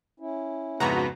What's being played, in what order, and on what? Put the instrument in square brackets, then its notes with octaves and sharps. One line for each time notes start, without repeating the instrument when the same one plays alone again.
[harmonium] C#4 E4
[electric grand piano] F2 G#2 C#3 [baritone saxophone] B3 [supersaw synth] F#4 A#5